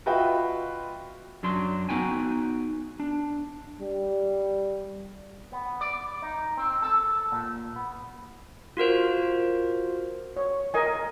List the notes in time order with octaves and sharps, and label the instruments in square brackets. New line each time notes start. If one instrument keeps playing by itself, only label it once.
[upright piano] F4 F#4 B4 D#5 E5 G5
[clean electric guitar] F#2 F#3 D4 C6
B3 D#4 F#4 G5 G#5
D4
[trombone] G3
[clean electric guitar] B3
D5
D#4
C4
A4
A#2
B3
[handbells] F4 F#4 A#4 C5
[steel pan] C#5
A#4 D#5 G#5